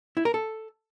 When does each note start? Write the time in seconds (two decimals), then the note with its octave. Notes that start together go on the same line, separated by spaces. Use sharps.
0.17 E4
0.25 A#4
0.34 A4